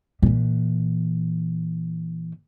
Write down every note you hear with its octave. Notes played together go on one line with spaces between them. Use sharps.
A#2 E3